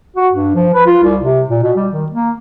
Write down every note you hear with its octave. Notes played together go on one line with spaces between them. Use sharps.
F#4
G2
F3
B4
F4
C2
C3
A#2
B2
G3
D#3
A#3